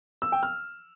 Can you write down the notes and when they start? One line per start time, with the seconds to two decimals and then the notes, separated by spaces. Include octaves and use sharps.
0.22 E6
0.32 G5
0.43 F6